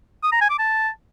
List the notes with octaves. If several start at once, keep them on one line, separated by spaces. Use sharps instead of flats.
D#6
A#5
G#5
D6
A5